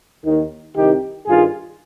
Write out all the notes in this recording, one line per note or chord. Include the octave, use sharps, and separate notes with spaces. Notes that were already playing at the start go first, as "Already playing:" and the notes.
D#2 D#3
C2 C3 D#3 D#4 G4
G2 D#3 F4 G#4